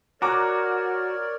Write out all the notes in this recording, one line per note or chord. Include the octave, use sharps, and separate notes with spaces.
F#4 A#4 C#5 D5 A#5 D6 F#6